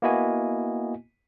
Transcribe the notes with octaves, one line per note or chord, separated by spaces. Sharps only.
A#3 B3 E4 F#4 D#5 G#5